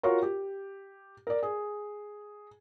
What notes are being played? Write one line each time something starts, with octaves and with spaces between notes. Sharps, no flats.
F4 F#4 A#4 C#5 C#6
G4
A#4 D5
G#4